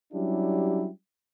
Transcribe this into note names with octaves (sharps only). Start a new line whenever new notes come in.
F#3 G3 C#4 D4 E4 G4